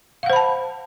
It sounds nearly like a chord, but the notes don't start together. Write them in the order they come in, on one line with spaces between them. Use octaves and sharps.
F5 F#5 C5 B5 A5